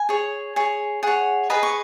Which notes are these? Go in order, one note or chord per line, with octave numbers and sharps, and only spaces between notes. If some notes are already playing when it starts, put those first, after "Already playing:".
Already playing: G#5
G#4 C#5
G#4 C#5
G#4 C#5 F#5
G#4 B4 D#5 B5
C#6